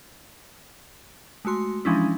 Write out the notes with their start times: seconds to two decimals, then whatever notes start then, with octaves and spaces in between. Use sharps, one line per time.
1.45 G#3 A3 F#4 C6
1.85 E3 F3 G#3 C#4 D4 E4